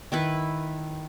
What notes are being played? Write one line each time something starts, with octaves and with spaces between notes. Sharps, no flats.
D#3 E4 B4